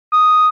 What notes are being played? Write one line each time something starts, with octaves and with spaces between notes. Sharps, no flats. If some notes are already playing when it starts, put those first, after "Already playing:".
D#6